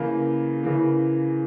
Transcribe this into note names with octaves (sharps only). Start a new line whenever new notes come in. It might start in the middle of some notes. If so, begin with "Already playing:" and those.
Already playing: C#3 E3 A#3
C#3 E3 A#3